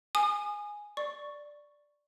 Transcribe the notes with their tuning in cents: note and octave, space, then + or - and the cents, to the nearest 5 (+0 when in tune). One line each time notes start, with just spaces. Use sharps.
G#5 +0 D#6 -35
D5 +0 C#6 +0